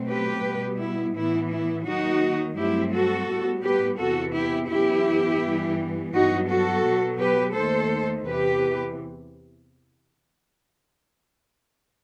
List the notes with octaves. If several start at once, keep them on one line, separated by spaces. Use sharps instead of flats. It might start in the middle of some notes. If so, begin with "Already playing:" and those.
Already playing: B2 F#3 A3 C4
G4 B4
B2 G3 B3
E4
A2 E3 B3 E4
E4
D#2 D#3 F#3 D#4 F#4
G2 F#3 A3 C4 E4 G4
F#4 A4
A2 G3 B3
G4 B4
E2 C3 E3 B3 F#4 A4
E4 G4
F#2 E3 B3 E4 G4
G2 E3 G3 B3
G2 F#3 B3 D#4 F#4
F#4 A4
B2 F#3 B3
G4 B4
D#2 D#3 A3 A4 C5
E2 C3 E3 G4 B4